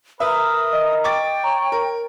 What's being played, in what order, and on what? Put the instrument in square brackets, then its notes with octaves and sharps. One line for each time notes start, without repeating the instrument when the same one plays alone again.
[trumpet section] A#4 [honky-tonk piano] B4 E5 [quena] D#6
[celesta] D#5
[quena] G5 [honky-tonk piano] C#6 D6 A6
[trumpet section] C#5 [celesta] A#5
[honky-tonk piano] A#4